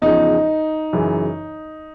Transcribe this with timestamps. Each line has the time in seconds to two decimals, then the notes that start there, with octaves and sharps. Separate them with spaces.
0.02 E2 C#3 F3 D#4
0.93 F#2 C#3 E3